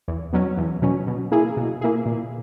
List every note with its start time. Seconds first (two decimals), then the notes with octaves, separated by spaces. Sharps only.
0.08 E2
0.33 B2 F#3 C#4
0.57 E2
0.82 B2 F#3 C#4
1.07 B2
1.31 A#3 E4 G#4
1.57 B2
1.81 A#3 E4 G#4
2.06 A#2